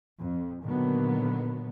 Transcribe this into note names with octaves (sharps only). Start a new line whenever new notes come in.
F2
A#2 D3 D#3 F#3 A#3 B3